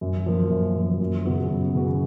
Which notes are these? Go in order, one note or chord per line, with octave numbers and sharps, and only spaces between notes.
F#2
F3 A#3
F#2
F3 A#3
F#2
C#3 F#3 B3 F#4
F#2
C#3 F#3 B3 F#4